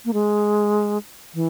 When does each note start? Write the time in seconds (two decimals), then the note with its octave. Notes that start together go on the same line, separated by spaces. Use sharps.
0.05 A#3
0.13 G#3
1.34 E3